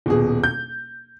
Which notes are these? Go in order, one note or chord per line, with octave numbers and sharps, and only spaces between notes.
D#1 B2 G#4
G6